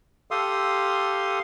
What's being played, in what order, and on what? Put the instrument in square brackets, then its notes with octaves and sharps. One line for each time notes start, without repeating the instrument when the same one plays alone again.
[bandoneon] G4 A4 F5 C6 D#6